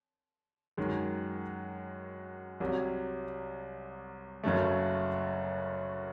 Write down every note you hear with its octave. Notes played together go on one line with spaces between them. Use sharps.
F#2 D#3 G#3
C2 C3 F#3
F#1 F#2 C#3 F#3 A3